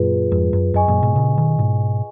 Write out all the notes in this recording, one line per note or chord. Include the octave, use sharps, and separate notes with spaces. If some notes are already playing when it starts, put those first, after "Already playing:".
Already playing: F#2 A#2 F4 G#4 B4
F2 G#2
F#2
F#2 G#4 D#5 G#5 C#6
F#2 A#2
G#2 B2
A#2 C#3
B2 D#3
G#2 B2